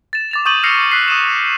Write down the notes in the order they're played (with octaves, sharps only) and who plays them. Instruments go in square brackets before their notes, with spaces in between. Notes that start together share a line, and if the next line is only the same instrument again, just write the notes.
[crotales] A6 E7
D6 A6 F7
C#6 D#6 G6 A6 D#7 F#7
E6 F6 A#6 C7 C#7 F7
F#6 B6 C7
D#6 D#7 E7